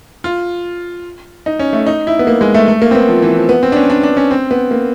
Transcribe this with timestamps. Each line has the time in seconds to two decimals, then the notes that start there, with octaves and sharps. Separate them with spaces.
0.24 F4
1.46 D#4
1.59 C#4
1.73 A3
1.87 D#4
2.07 E4
2.19 B3
2.27 A#3
2.41 G#3
2.54 A3
2.68 A3
2.82 A#3
2.91 C4
2.95 B3
3.09 F3
3.22 E3
3.36 F3
3.49 B3
3.63 C4
3.72 D4
3.76 C#4
3.90 D4
4.03 D4
4.17 C#4
4.31 C4
4.51 B3
4.71 A#3